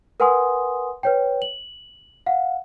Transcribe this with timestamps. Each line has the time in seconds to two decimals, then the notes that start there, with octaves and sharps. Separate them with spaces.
0.20 A#4 B4 F#5 G#5 C6 D#6
1.03 B4 C#5 G5
1.42 F#7
2.26 F5 F#5